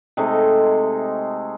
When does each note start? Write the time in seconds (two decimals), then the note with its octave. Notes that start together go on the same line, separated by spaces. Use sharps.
0.17 C3 G#3 A3 D#4